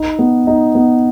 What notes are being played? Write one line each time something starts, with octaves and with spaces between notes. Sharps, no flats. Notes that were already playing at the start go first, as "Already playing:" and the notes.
Already playing: D#4
B3
D#4
B3